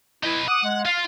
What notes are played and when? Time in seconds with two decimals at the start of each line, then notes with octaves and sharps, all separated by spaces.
0.24 D#4 E4 B4
0.48 F#5 D6 D#6
0.63 G#3
0.85 F4 F5